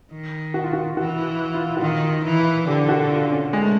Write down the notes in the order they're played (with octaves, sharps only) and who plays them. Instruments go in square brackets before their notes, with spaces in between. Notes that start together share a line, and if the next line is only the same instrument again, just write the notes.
[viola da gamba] D#3
[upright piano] F#4
F4
F#4
[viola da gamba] E3 [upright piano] F#4
[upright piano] F4
F#4
[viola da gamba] D#3 [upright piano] F4
[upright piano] D#4
[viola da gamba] E3
[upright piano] E4
[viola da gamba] D3 [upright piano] G4
[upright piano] G4
F#4
F4
C#4
G#3
A3